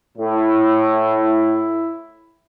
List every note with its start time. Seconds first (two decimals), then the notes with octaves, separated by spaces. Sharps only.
0.18 A2 E4